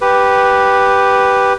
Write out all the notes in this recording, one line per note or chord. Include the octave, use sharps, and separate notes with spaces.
G4 B4